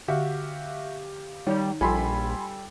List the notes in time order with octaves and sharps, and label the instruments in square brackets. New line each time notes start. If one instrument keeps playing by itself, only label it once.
[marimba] D3 [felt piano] F#4 E5 [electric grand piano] G4 F5
[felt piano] D#3 [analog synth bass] G3 [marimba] D#4 C#5
[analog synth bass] A#1 [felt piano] G3 G4 A4 [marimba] F4 [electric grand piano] G#5 B5 C6